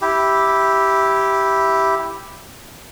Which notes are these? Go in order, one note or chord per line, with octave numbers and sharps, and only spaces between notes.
E4 G4